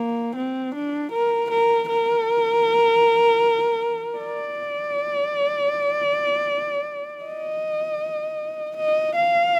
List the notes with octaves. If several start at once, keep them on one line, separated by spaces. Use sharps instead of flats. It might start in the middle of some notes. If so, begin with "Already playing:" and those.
Already playing: A#3
C4
D4
A#4
A#4
A#4
D5
D#5
D#5
F5